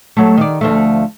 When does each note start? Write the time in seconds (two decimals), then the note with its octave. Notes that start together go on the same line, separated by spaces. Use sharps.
0.17 F#3 A3
0.38 D#3 D5
0.61 D2 F3 A3